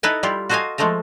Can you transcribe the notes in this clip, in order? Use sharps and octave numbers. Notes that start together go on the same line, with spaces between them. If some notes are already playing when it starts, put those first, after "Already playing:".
D#4 E4 A4 B4 D#5 G#5
G3 E4 F4 G4
F#4 A4 C5 D#5 F5 G#5
F3 G#3 A3 A4 A#4